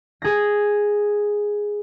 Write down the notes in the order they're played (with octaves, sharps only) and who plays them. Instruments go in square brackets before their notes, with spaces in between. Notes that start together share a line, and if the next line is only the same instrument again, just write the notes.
[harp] G#4 A#6